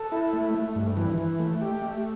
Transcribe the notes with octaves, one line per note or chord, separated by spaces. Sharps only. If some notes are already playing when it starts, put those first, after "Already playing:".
Already playing: A4
E4
A3
A3
G2
E3
E3
A3
G4
A3